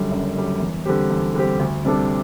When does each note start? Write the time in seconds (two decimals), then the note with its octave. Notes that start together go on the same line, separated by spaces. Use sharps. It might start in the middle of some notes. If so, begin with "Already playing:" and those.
Already playing: F#2 D3 G3
0.11 F#1
0.36 F#2 D3 G3
0.60 E2
0.86 D3 G3 C4 G4
1.11 E2
1.34 D3 G3 C4 G4
1.60 D2
1.85 C3 G3 D4 A4